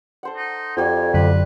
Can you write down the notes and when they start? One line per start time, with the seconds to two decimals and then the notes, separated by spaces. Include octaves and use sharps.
0.23 A4 C5 F#5
0.37 D#4
0.77 F2 F#4 G4 D5 G#5
1.14 F#2 D3 B4